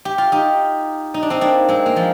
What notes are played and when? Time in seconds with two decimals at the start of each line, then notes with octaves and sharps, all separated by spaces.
0.05 G4
0.18 F4
0.32 D#4 G4
1.14 D#4
1.23 D4
1.30 C4 D#4
1.41 A#3 D4
1.68 G#3 C4
1.86 A#3
1.96 F3 G#3